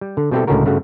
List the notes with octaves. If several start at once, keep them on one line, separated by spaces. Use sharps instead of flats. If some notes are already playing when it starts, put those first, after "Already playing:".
G3
D3
B2 G3 C4 E4 G4 A4
C#2 A2 D3 C#4 F#4 A#4
G2 C#3 A3 F#4 F#5